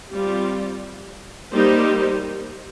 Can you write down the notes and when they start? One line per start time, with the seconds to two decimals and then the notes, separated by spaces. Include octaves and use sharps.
0.11 G3 C4 F4
1.52 G3 A#3 D#4 G4 C5